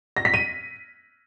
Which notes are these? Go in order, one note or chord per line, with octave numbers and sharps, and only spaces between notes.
A#6
B6
D#7